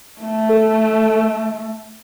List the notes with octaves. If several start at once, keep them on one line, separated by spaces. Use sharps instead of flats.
A3
A4